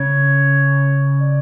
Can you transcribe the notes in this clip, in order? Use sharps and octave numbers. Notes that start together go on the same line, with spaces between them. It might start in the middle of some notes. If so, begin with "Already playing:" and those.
Already playing: C#3 C#5
D5